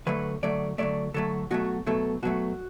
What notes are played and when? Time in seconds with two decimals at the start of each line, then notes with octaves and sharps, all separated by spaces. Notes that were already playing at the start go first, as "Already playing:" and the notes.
0.07 D3 F#3 A3 B4
0.43 D3 F#3 A3 D5
0.78 D3 F#3 A3 D5
1.14 D3 F#3 A3 A4
1.51 B2 F#3 A3 F#4
1.86 B2 F#3 A3 A4
2.23 B2 F#3 A3 F#4